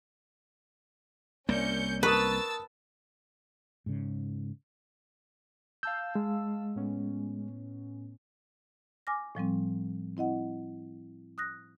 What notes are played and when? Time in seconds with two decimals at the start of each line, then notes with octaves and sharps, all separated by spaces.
1.49 C2 A#3 C#4 D5 G6 C#7
2.03 A#4 B4 A5 C#6 D#6 E6 A6
3.86 G#2 C#3
5.83 F5 A5 E6 G6
6.15 G#3
6.75 A2 B3 C#4
9.07 G#5 D6 F6 A#6
9.35 A2 F3 G3 C4
10.17 C4 E4 D#5 F#5
11.38 D#6 F#6 A#6